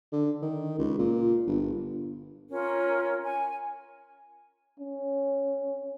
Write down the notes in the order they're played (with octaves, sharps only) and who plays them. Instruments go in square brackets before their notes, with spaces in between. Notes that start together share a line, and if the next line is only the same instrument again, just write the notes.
[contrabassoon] D3
D#3
C#2
A#2
G1
[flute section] C#4 F4 A#4
G#5
[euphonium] C#4